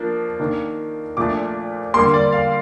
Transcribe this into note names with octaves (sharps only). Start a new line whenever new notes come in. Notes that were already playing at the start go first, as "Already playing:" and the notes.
Already playing: F3 A#3 D4
D#3 A#3 D4
A#2 F3 A3 D4 D6
D3 G3 A#3 C6
D5
F5